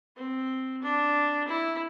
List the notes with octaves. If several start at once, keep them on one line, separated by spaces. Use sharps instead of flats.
C4
D4
E4